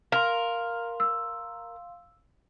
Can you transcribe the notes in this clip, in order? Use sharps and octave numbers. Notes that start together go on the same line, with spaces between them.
A#4 F5 C6
E6